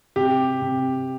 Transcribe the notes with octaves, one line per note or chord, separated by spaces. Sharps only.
C3 G4
C3